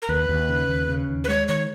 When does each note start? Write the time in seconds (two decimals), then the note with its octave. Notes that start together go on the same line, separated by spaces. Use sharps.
0.02 A#4
0.09 D#2 B4
0.29 D#2
0.49 C#3
0.69 D#2
0.89 C#3
1.09 D#2
1.24 B4
1.29 G#3 C#5
1.48 D#3 C#5